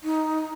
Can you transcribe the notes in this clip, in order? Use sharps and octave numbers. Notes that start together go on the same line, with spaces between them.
D#4